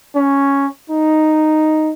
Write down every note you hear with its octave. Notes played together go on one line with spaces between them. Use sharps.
C#4
D#4